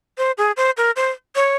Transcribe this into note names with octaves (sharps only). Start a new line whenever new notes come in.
C5
G#4
C5
A#4
C5
C#5